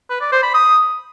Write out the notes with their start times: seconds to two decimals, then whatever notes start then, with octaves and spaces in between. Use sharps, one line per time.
0.10 B4
0.21 D5
0.32 C5
0.43 B5
0.54 D#6